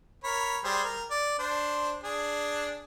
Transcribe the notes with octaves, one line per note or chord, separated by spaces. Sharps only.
A#4 C#5 B5
G3 G#4 C5
A#4
D5
D4 C5
D4 G#4